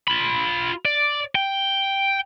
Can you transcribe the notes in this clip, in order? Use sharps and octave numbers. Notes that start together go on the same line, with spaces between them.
F4 B5
D5
G5